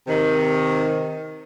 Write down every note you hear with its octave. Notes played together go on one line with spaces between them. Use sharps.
C3 D#3